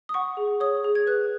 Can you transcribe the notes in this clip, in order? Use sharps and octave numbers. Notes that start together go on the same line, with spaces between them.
D#6
F#5 C#6
G#4
C#5 D#6
G#4
G#6
B4 F#6